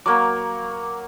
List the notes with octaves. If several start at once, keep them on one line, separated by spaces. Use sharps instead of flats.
F#3 A#3 D6